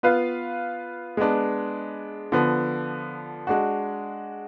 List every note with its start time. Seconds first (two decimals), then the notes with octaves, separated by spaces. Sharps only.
0.03 B3 F4 B4 F5
1.17 G#3 B3 D4
2.32 D3 F3 B3
3.47 G#3 D4 F#4